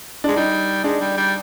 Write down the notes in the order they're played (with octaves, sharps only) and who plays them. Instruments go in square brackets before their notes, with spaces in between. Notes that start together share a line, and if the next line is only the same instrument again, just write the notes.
[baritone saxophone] G#3 [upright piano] D4
[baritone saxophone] G3 [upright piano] D#4
[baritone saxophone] G#3 [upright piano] D4
[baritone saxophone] G3
G3